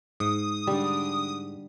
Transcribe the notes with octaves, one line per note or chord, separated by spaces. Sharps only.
G#2 D#6
D3 G3